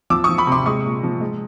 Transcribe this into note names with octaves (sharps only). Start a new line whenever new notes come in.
F3 D6 E6
C#6 D#6
F3
B5 C#6
C3 C6 D6
G#3 C#6 D#6
A#2
F3
G#3